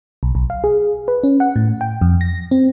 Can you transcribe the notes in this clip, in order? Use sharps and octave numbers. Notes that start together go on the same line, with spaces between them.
B1
B1
F5
G#4
B4
C#4
F#5
A2
G5
F2
A#6
C4